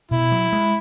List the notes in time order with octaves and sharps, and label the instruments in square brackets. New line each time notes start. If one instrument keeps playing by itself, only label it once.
[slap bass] B2 [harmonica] E4
[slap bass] F#3
G#3